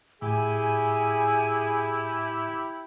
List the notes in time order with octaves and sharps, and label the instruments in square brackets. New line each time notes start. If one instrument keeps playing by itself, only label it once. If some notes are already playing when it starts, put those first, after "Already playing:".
[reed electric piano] A2 [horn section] E4 G4 [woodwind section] G#4 [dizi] G#5